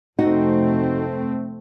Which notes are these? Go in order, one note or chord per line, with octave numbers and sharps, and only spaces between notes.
F1 A3 C4 D#4 F#4